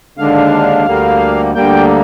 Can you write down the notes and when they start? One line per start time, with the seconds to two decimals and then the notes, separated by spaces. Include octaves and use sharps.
0.17 D#2 D3 G#3 D4 F5
0.86 D2 D3 G3 A#3
1.55 D2 D3 G3 A#3 G5